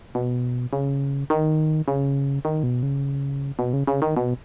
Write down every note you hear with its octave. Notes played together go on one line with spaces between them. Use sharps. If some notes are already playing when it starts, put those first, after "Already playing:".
B2
C#3
D#3
C#3
D#3
B2
C#3
B2
C#3
C#3
D#3
B2